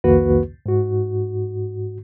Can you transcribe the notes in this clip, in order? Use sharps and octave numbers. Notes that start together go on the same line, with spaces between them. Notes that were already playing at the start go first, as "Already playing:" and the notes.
C2 F2 D#3 A#3 F#4 B4
G#2 F#4